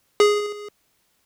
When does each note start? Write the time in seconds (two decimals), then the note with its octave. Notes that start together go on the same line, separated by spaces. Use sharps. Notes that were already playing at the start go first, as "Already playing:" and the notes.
0.20 G#4